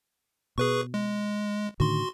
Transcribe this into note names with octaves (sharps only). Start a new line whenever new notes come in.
B2 G#4 B4 C#6
G#3
A2 D3 D#3 F#4 C6